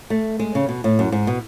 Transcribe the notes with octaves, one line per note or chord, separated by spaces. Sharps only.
A3
G#3
C#3
B2
A2
F#2
G#2
B2